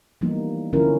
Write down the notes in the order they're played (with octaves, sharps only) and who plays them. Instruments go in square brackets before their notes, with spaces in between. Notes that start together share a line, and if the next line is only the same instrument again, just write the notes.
[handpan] E3 F3 G3 A#3 B3 D#4
D3 F3 C#4 E4 F4 A#4